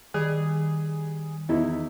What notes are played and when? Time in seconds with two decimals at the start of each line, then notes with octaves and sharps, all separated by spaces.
0.14 D#3 G3 G#4
1.49 E2 D#4 E4